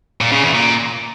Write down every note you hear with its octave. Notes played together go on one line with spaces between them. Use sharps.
A#2
C#3
E2
A#2